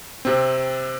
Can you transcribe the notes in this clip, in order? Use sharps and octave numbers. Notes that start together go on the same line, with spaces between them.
C3 C4